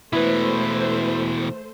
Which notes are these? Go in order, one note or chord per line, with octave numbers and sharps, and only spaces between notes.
B2 E3 A3 E4 B4 C5